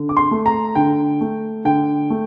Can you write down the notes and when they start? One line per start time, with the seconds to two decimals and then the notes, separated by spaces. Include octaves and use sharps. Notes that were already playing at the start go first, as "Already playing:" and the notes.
Already playing: D3
0.09 D6
0.17 C6
0.31 A3
0.46 A#5
0.75 D3 G5
1.21 A3
1.65 D3 G5
2.10 A3